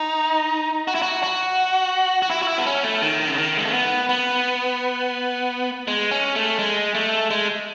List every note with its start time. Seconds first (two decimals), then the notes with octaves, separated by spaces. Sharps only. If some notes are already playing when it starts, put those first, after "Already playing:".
Already playing: D#4
0.88 F#4
0.95 E4
1.02 F#4
1.23 F#4
2.22 F#4
2.30 E4
2.42 F#4
2.48 E4
2.58 B3
2.66 C#4
2.84 A3
3.02 D#3
3.27 C#3
3.38 D#3
3.57 G#3
3.65 A3
3.73 B3
4.09 B3
5.88 G#3
6.11 C#4
6.36 A3
6.59 G#3
6.95 A3
7.31 G#3